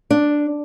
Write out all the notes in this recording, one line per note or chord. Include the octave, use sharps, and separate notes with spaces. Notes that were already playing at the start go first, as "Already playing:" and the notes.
D4